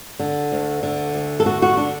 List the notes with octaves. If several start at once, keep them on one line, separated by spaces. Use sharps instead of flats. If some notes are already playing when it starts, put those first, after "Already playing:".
D3
D2
D3
D2
A4
D3 F#4
F#4
D4